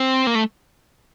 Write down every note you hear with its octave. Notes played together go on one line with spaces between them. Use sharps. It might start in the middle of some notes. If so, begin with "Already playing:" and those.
Already playing: C4
A#3
A3